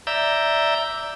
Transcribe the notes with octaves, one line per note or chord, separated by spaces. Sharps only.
D5 E5 A#5 E6 G6